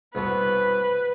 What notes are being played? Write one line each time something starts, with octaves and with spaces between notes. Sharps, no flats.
C2 B2 B4